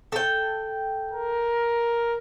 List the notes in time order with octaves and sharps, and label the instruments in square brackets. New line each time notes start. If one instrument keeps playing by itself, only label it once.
[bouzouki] A4 G5
[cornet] A#4